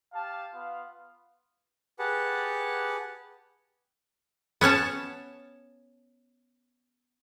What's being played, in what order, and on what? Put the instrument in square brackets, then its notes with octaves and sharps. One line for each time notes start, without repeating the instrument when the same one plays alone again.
[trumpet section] G4 F5 A5
B3 F4 F5
[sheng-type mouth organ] G4 G#4 B4 F#5 A5
[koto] B3 C#4 C#5 A5